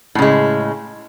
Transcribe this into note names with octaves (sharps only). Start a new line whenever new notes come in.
A2 C#3 G#3